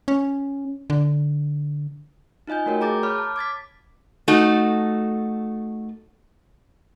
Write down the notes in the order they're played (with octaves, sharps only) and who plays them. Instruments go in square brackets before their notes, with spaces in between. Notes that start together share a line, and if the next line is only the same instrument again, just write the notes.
[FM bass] C#4
D3
[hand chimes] D#4 F4 D#5 G#5 G6
A3 F#4 A#4 C#5 G5
G#4 A#5 D6 G6 A6
C#5 B5 D6 F6
A5
D6 G#6 A6 B6
[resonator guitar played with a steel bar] A3 D#4 F#4 A4